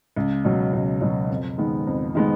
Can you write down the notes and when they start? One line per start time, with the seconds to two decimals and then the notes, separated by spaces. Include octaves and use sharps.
0.16 C#2
0.44 B2 F#3
0.73 C#2
1.01 B2 F#3
1.30 F2
1.58 D#3 G#3 B3
1.87 F2
2.15 D#3 G#3 B3